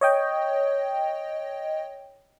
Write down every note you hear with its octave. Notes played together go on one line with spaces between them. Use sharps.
C#5 D#5 G5